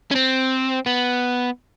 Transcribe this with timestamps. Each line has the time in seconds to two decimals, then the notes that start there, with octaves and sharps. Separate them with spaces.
0.11 C#4
0.15 C4
0.86 B3